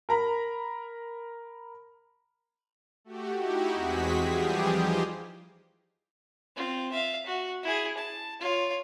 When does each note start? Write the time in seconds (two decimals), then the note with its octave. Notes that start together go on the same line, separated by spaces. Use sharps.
0.09 A#4 A#5 B5
3.05 A3 F#4 G4
3.38 D#4 E4 F#4 G4
3.73 E2 G#3 C4 F#4 G#4 B6
4.20 E3 F3 G3 G4 G#4
4.71 D#4 F4 G4 C5 D#5
6.56 C4 F4
6.92 E5 F5
7.26 F#4
7.63 E4 G#4
7.97 A5
8.40 F4 C#5